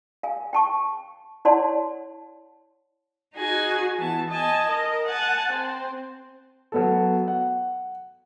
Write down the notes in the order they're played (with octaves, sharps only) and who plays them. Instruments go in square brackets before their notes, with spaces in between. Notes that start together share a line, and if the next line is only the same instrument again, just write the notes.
[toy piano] F5 G#5
G5 A5 C#6
E4 C#5 D5 F#5 A5 C6
[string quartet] D#4 F#4 G#4 G#5
E3 B3 A5
D#5 G#5 A5
A#4 D#5
F#5 G#5 A5
C4 C5
[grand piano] F#3 B3 A4
F#5